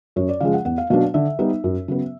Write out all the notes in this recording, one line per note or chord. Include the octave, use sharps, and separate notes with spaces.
F#2 C#5
D5
C#3 F3 G#3 F5
F#5
E2 F#5
F5
B2 F#3 B3 D4 F5
D3 E5
G3 B3 D#4
F#2
C#3 F#3 B3